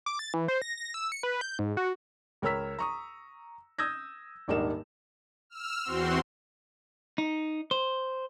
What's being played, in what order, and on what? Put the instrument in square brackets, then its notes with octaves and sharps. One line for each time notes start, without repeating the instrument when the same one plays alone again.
[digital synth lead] D6
A6
E3
C5
A#6
A#6
E6
C#7
B4
G6
G#2
F#4
[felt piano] C#2 A#4 C#5 A#5 E6 B6
A#5 C#6 D#6
D#6 E6 G6 G#6 A#6
D#1 G#1 D4 D#4 A#4 E7
[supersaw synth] E6 F6
E2 C4 F#4 C6
[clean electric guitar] D#4
C5